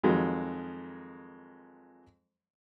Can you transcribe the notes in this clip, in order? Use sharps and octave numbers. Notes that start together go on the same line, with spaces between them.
F2 D#3 F3 F#3 G#3